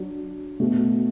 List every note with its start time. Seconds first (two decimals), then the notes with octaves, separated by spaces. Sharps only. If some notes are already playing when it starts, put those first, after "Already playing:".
Already playing: F#3 D4 F#4
0.60 B2 A3 F#4